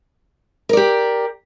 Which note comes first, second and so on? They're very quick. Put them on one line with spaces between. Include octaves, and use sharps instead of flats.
A#4 D5 G4